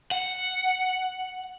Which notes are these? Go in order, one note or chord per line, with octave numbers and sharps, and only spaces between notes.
F#5